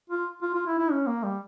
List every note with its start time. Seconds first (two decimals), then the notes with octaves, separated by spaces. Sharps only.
0.10 F4
0.42 F4
0.54 F4
0.66 E4
0.78 E4
0.91 C#4
1.07 A#3
1.24 G3